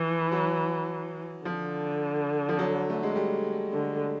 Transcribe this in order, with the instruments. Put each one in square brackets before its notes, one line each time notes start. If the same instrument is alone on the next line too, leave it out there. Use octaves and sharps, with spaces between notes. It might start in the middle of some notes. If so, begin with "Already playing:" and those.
Already playing: [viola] E3 [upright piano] F3
[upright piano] F#3
[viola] D3 [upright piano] F3
[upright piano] F3
F#3
A3
G#3
G3
[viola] D3